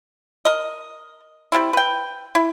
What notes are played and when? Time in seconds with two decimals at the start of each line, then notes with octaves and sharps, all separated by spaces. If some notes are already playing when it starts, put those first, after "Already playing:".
0.45 A#4 D#5
1.52 G3 G#3 C4 E4
1.73 B4 G5
2.35 E4